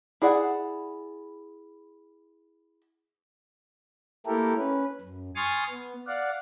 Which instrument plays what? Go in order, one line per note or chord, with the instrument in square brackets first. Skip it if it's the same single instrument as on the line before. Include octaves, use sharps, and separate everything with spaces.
[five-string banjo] E4 G#4 D5 F#5
[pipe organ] A3 A#3 E4 G4 A4 A#4
C#4 B4
F#2
G#5 C6 C#6 D#6 F6 A6
B3
D5 F5 F#5